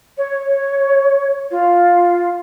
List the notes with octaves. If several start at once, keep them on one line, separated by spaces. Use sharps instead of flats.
C#5
F4